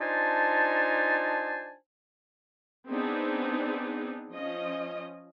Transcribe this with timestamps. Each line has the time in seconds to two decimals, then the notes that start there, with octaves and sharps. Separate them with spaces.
0.01 D4 D#4 F4 C5 G#5 A5
2.88 B3 C4 D4 D#4 G#4
4.31 F3 C#4 D#5